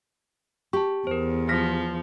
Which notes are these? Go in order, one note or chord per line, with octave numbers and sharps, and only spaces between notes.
G4 A5 C#6
E2 A#4 C5
F3 F6 A#6 B6